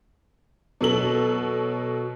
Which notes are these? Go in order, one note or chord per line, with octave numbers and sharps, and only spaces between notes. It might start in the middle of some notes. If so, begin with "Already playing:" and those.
B2 F#3 A4 F#7